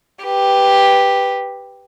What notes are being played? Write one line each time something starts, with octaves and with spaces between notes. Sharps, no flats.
G4 B4